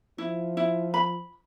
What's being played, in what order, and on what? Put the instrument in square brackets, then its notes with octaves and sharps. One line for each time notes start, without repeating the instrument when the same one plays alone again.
[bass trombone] F3 [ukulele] E4
[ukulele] E4
B5